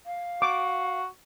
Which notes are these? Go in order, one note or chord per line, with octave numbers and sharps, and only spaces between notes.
F5
F#4 D6